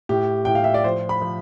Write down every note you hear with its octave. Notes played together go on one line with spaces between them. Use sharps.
A2 G4
A2 G5
F5
E5
D5
F3 C5
B5
F3